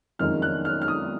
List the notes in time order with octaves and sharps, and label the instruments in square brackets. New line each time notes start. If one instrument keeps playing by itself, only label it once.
[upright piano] F#1 F2 D#3 G#3 D#4 F6
F#6
F6
F6
D#6